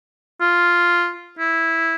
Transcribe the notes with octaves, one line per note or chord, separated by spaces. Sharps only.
F4
E4